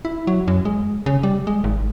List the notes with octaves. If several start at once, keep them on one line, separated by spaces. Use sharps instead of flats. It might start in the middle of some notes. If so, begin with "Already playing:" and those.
E4
F#3
F#2
G#3
C#3
G3
G#3
G#1